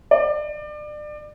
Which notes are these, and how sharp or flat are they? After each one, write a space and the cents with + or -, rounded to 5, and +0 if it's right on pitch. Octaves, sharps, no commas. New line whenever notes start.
D5 +30